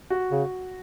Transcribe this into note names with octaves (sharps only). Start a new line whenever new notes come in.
F#4
C#3